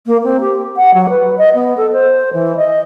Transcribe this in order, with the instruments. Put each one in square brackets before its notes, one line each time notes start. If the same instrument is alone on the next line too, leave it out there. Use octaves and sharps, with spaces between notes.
[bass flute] A#3
C4
G4
F#5
F#3
B4
D#5
B3
A4
C5
E3
D#5